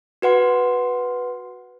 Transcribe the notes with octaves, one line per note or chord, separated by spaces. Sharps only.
F#4 B4 F#5 C6